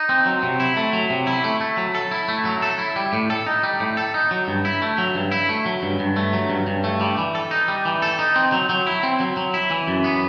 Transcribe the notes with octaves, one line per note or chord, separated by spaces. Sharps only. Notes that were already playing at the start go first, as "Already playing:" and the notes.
Already playing: D#4
C4
F#3
C3
E4
A3
F#3
C3
E4
A3
A3
F#3
A4
E4
A3
F#3
A4
E4
G3
A2
A4
D#4
G3
A2
A4
D#4
F#3
G2
E4
A3
F#3
G2
E4
A3
F#3
G2
G2
A3
F#3
G2
G2
A3
G3
E3
A4
D#4
G3
E3
A4
D#4
C4
F#3
F#3
E4
C4
F#3
F#3
E4
E3
F#2
B3